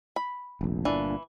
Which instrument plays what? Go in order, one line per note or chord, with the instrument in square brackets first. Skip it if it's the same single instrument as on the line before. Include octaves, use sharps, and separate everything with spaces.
[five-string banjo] B5
[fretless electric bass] F1 A#1
[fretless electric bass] G1 A#2 D4 [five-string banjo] E3